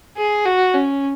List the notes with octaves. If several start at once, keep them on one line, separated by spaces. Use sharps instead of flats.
G#4
F#4
C#4